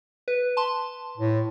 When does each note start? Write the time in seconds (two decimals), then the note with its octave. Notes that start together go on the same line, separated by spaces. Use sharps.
0.28 B4
0.57 A5 C6
1.18 A2